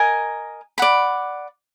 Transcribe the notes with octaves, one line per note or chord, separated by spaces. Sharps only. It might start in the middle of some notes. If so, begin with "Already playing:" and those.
Already playing: A#4 D#5 G#5
D5 F#5 B5